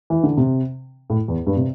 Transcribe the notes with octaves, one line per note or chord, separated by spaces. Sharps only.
E3
D3
C3
A2
E2
G2
C3